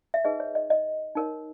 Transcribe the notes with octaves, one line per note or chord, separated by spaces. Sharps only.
E5
D#4 G#4 B4 D#5
C#5
D#5
D#5
D#4 A#4 C#5